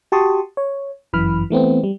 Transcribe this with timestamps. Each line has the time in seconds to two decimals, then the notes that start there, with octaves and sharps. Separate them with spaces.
0.12 F#4 G4 A5 C6 C#6 D#6
0.57 C#5
1.13 G1 F#2 E3 B5 F6
1.50 E3 A3 B3 C4
1.84 G3